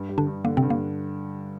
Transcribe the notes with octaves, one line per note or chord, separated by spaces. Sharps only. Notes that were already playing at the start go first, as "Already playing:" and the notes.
Already playing: G2
G3
D3 D4
G2
D3 A#3
C3 C4
G2
A#3